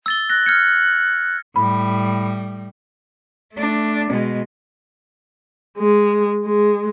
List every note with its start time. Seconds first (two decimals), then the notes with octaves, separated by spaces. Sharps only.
0.06 E6 A6 G7
0.30 F#6 A#6
0.46 F6 G#6 C#7
1.56 A2 G3 B5
3.54 A3 D4
4.10 B2 G#3
5.78 G#3
6.45 G#3